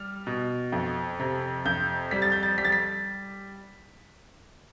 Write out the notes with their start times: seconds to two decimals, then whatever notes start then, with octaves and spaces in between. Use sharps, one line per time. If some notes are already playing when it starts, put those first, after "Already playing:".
Already playing: G3 F6
0.27 B2
0.72 F2
1.20 C3
1.65 F2 G6
2.11 G3 B6
2.22 A6
2.32 G6
2.43 A6
2.58 G3 B6
2.65 A6
2.72 B6